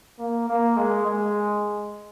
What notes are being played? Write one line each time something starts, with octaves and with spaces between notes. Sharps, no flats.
A#3
A#3
G#3
G#3